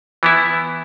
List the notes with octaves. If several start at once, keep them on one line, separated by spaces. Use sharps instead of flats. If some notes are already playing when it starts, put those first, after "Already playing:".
E3 B3 E4